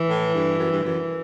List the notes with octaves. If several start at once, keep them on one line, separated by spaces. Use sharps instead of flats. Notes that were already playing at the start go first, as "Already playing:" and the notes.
Already playing: E3
A2
G2
F#2
G2
F#2 E3